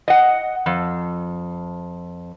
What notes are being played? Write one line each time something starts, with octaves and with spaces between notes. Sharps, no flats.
D#5 F#5
F2